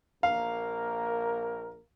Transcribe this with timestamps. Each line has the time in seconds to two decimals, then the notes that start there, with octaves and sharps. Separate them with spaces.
0.23 A#1 A#3 A#4 F5